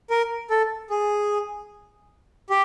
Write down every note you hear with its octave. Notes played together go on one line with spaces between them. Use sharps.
A#4
A4
G#4
G4